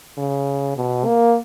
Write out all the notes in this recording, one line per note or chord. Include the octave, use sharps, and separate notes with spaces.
C#3
B2
A#3